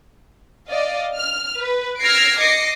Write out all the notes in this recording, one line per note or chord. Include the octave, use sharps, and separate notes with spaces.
D5 D#5 F5
F6
B4
E6 F6 G#6 A#6 C7 D7
D#5 D6 A#6 C7 C#7